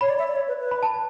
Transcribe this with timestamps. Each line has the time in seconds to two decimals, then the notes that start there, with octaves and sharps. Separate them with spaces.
0.01 C#5 B5
0.09 D5
0.19 E5
0.28 D5
0.35 C#5
0.48 B4
0.60 B4
0.71 B5
0.83 A5